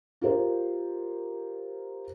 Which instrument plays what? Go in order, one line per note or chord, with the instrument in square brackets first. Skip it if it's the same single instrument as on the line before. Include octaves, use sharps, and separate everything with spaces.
[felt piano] F4 G4 A#4 C5